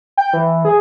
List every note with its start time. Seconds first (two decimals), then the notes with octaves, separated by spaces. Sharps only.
0.17 G5
0.33 E3
0.65 G#4